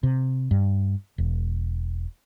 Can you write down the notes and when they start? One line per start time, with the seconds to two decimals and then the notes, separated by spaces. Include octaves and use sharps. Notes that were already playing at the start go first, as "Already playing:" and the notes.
0.03 C3
0.51 G2
1.18 E1